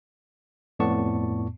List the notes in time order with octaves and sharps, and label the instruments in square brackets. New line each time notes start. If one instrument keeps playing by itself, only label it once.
[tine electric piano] F2 A2 B3 D5 A5 C#6